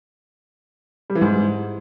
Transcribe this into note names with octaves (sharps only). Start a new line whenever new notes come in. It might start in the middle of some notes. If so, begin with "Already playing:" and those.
G3
E3
G#2